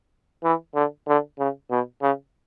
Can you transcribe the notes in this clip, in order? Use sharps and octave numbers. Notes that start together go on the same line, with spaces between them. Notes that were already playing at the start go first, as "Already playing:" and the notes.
E3
D3
D3
C#3
B2
C#3